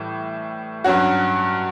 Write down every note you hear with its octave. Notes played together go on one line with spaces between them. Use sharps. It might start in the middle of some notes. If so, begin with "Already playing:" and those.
Already playing: A2 E3 G3
G2 F#3 C#4 F#4